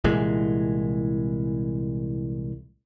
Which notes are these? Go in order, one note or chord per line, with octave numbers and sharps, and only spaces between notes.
C2 A#2 E3 G#3